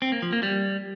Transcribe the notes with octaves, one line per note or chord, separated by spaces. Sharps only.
C4
A#3
F3
A#3
G3